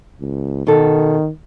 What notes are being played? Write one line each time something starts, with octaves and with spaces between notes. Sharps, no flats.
C#2
B2 D#3 A4